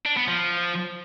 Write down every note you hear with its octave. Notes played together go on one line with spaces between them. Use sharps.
D4
B3
F3